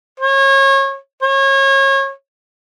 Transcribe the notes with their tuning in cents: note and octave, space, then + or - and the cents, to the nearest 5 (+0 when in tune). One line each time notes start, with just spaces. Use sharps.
C#5 -30
C#5 -30